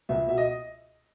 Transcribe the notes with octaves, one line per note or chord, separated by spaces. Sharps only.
C#2 E5
B2 E5
D#5